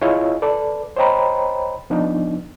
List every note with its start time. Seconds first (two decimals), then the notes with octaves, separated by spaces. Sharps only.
0.01 E4 F4 G#4 C#5 D#5
0.42 A4 B4 D5
0.96 C5 C#5 D#5 G5 A#5 B5
1.90 F3 B3 D4 D#4